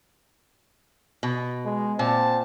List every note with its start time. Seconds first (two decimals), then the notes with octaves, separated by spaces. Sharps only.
1.23 B2
1.65 G#3
1.99 A#2 C4 A5